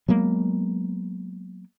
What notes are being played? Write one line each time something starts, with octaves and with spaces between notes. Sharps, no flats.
F#3 G#3 A#3 B3